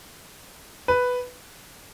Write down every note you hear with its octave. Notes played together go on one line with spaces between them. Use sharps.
B4